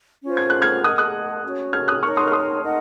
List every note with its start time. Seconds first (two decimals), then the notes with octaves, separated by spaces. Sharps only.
0.24 C#4 F4 C5
0.37 G#6
0.50 F#6
0.62 F6 G#6
0.83 A#4 D#5 F#5 D#6 F#6
0.98 D#6 F#6
1.44 C#4 F#4 C#5
1.73 F6 G#6
1.88 D#6 F#6
2.03 D#4 A#4 C#5 C#6 F6
2.17 C6 D#6
2.28 F6
2.32 C6 D#6
2.62 D#4 A#4 D#5 F#5